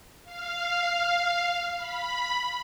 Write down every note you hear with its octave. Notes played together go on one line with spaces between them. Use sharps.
F5
B5